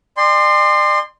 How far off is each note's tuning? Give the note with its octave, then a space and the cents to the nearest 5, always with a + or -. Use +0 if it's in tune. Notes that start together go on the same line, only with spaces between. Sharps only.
D5 +40 G5 +45 C6 +0